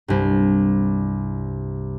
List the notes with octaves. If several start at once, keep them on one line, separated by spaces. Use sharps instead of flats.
C2 G2